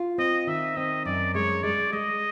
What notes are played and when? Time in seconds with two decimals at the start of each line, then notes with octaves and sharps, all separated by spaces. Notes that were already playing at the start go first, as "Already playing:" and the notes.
Already playing: F4
0.18 C4 D#5
0.47 D#3 E5
0.77 C4 D#5
1.06 F#2 D5
1.34 G#3 C#5
1.63 G#3 D5
1.93 G#3 D#5